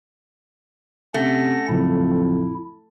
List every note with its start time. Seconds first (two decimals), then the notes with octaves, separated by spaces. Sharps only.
1.14 C3 A3 C#4 F#5 A#6
1.69 A1 F2 C#3 F#3 E4